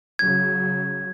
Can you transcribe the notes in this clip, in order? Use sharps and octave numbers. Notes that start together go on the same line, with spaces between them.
C#3 F#3 G#6